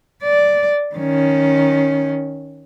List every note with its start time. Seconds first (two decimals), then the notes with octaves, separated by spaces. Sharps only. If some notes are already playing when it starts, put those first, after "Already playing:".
0.23 D5
0.95 D#3 C#4